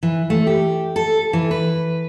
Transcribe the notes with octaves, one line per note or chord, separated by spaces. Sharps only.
E3
A3
G4
A4
E3
B4